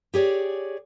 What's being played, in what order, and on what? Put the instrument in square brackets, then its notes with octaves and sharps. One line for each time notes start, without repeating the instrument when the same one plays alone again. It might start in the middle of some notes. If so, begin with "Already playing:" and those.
[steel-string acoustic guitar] G4 G#4 C#5 D5